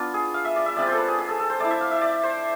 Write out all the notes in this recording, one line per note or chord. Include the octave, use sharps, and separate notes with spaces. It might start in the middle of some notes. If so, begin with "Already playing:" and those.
Already playing: B3 D4 F4
G#4
F5
E5
D5
E5
G#3 C4 F4 D5
C5
A4
B4
G#4
G#4
A4
A4
C5
A3 E4 D5
E5
F5
E5
D5
C5